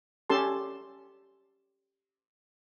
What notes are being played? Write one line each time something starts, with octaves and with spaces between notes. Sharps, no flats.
C#4 G4 A4 A5 C6